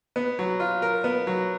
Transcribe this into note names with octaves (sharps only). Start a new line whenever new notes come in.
B3
F#3
F4
A#4
B3
F#3